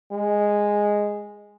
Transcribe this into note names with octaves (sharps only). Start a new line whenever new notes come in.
G#3